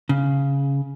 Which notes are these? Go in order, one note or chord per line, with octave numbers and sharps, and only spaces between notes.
C#3